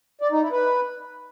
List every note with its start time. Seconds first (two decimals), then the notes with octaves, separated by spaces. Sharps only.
0.21 D5
0.31 D#4
0.42 E4
0.52 B4